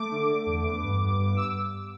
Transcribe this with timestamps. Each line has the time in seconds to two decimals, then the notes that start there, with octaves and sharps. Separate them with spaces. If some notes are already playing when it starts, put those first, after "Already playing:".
Already playing: A3 D6
0.11 D3
0.28 D3
0.46 E2
0.64 B3 D6
0.82 G2
1.01 G2
1.19 G2
1.37 E6